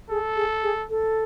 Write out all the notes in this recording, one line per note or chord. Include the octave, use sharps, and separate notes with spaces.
G#4 A4
G#4
G#4
A4